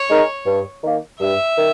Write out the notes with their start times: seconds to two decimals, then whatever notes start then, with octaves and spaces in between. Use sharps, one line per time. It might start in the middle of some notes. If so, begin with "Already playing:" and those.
Already playing: C#5
0.09 G#3 D#4 A#4
0.46 G2
0.83 D#3 A#3
1.20 G2 E5
1.58 D#3